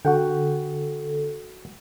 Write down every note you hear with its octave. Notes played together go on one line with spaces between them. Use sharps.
D3 F#4 A4 F#5 G5